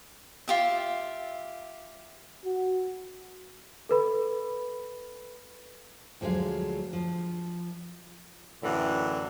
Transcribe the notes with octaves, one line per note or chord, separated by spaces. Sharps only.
F4 G4 E5
F#4
A4 B4 B5
D2 F3 F#3 G#3 F5
F3
F#2 A2 D3 E3